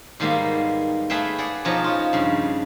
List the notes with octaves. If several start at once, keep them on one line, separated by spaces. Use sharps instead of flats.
G#2 D#3 G3 A#3 B3
A3 G#4 B4 E5 F5 G5
G#4 D5 F#5
B2 F3 D#4 C#5 A#5 B5
C#4 F4
G2 C#3